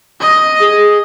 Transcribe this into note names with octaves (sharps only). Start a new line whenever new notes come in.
D#5
G#4